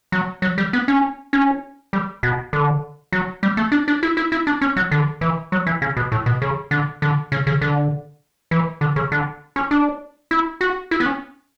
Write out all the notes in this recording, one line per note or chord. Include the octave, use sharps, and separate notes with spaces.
F#3
F#3
G3
B3
C#4
C#4
G3
B2
D3
F#3
G3
A3
D4
D4
E4
E4
E4
D4
C#4
F#3
D3
E3
F#3
E3
C#3
B2
A2
B2
C#3
D3
D3
C#3
C#3
D3
E3
D3
C#3
D3
C#4
D4
E4
F#4
E4
B3
C#4